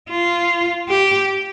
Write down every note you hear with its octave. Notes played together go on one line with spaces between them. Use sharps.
F4
G4